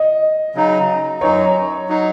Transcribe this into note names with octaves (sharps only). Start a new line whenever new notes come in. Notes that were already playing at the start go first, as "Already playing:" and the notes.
Already playing: D#5
C#3 F#3 D#4
F#2 F#3 D#4 C#5
F#3 D#4